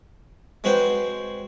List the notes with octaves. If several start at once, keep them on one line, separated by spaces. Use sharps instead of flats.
G#3 C4 F#4 B4 C#5 G5